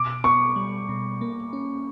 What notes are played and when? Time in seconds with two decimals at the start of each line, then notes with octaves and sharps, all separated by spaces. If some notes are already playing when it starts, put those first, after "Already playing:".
Already playing: B2 D6
0.24 B3 C#6
0.56 G3
0.89 B2
1.21 A#3
1.53 C#4